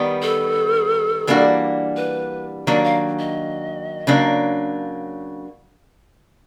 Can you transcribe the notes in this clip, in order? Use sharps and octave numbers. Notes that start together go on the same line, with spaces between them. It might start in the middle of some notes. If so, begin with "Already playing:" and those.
Already playing: D#3 G3 B3
A4
E3 G3 A#3 D4 F#4
B4
D#3 F#3 A#3 D4 D5
F5
D#5
C#3 F#3 A#3 D4